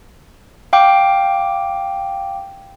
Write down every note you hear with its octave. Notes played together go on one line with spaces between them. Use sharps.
F5 G5 D6